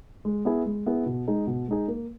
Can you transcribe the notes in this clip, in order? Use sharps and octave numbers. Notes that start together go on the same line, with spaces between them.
G#3
B3 E4 G#4
G#3
B3 E4 G#4
B2
G#3 D#4 G#4
B2
G#3 D#4 G#4
A#3